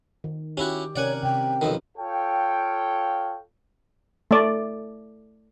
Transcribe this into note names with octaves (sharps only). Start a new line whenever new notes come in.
D#3
C#4 E4 F#4 G4
C3 C#4 A#4 C#5 D5 F#5 G#5
C3 G5
B1 F2 D#3
F4 A4 C#5 F5 G5
A3 D5